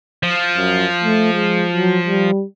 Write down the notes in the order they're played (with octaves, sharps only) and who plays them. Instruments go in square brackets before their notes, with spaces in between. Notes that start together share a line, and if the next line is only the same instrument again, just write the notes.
[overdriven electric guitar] F3
[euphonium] F#2
A3
G#3
F#3
G3